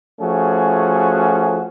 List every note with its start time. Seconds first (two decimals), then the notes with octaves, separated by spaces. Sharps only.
0.20 F3 A3 C#4 F#4 G#4